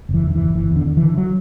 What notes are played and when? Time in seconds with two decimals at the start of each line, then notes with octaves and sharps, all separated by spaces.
0.09 F#1
0.14 E3
0.24 E2
0.30 D3
0.35 F#1 E3
0.55 F#1 E3
0.71 E2
0.76 D3
0.87 D3
0.97 D3 E3
1.18 F#3